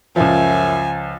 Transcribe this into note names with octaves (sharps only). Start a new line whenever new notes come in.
C#2 F#2 F3 E5 G#5